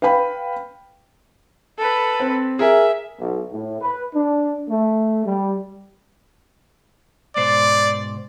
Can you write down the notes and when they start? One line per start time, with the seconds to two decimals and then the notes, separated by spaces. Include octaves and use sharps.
0.02 B4 F5 G5 B5
1.78 A4 B4
2.20 C4
2.59 G#4 A#4 E5 G#5
3.19 B1
3.51 A2
3.80 B4
4.14 D4
4.68 A3
5.25 G3
7.36 G#2 B2 C5 D5